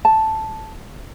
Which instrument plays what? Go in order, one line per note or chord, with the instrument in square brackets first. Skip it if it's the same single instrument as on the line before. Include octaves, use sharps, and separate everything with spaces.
[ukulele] A5